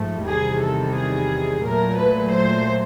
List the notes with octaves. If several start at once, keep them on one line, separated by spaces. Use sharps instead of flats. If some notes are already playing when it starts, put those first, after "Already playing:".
Already playing: G#2 F3 A3
E2 C3 D#3 G3 G#4
A4
G#4
A#2 F#3 A3 A#4
B4
C5